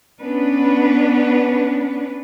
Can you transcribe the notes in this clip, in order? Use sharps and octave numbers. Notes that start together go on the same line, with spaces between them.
B3 C#4 D4 B4